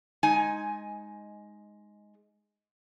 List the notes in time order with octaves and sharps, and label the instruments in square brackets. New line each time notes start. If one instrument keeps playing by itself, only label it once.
[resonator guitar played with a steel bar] G#3 D#4 G#5